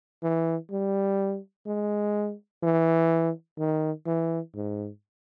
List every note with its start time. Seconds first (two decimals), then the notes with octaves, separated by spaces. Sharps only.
0.23 E3
0.71 G3
1.67 G#3
2.63 E3
3.58 D#3
4.06 E3
4.55 G#2